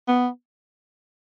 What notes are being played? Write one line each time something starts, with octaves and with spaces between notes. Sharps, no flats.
B3